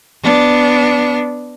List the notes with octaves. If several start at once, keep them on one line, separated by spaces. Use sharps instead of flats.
B3 D4